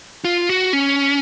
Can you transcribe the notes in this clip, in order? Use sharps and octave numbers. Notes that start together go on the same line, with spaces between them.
F4
F#4
C#4